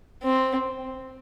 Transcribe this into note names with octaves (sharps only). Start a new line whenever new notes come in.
C4